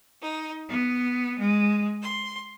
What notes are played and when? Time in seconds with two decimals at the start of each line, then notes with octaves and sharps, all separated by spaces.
0.22 D#4
0.69 B3
1.39 G#3
2.01 C6